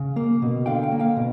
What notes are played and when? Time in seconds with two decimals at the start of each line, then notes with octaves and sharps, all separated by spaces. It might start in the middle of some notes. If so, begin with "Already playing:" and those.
Already playing: C#3 F5
0.16 A#3
0.42 B2
0.66 D3 F5 G5
0.83 F5 G5
0.92 A#3
0.99 F5 G5
1.16 B2